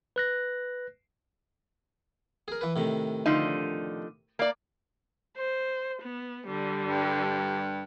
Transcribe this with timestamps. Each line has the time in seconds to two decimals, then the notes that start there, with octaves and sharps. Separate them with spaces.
0.16 B4 F#6 A#6
2.48 G#4 A#4
2.61 E3 B4
2.76 A2 C3 D#3
3.26 D3 F3 D#4
4.39 A#3 D5
5.37 C5
6.02 B3
6.47 D3 G3
6.85 G2